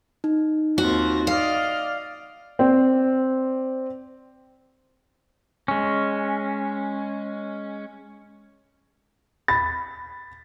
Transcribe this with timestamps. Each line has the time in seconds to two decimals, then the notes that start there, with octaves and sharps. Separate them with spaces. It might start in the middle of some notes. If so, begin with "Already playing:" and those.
0.24 D#4
0.78 D#2 C4 F4 F#4
1.27 D5 D#5 F5 F6
2.59 C4 D5
5.68 G#3 C#4
9.48 B5 A6